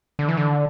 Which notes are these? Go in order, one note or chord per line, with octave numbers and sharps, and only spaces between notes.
D3
E3
D3